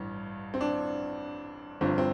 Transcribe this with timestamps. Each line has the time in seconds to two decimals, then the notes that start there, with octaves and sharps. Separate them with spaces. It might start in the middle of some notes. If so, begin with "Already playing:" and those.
Already playing: A1 G2
0.54 C4
0.61 D4
1.81 G1 G2 F3 C4
1.98 C4